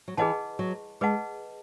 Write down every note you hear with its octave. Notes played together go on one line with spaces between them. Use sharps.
F#3
E3 G#4 B4 D#5 F#5 A5
F#3
G#3 G#4 B4 D#5 F#5 A5